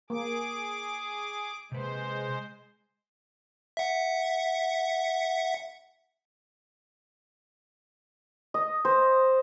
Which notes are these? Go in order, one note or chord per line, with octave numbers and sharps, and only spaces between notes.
A#3 G#4 D6
C3 G#3 B4 C5
E5 F#5
D#5
C5